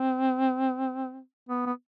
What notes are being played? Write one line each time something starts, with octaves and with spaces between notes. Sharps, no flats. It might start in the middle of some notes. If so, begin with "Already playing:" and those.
Already playing: C4
B3
B3